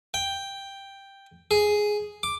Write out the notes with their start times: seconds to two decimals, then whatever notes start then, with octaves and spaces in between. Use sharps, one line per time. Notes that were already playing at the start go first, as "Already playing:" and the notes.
0.14 G5
1.51 G#4
2.23 D6